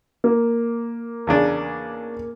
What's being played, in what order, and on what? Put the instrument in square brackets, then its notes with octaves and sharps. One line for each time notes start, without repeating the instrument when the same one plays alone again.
[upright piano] A#3
[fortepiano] E2 C#3 D4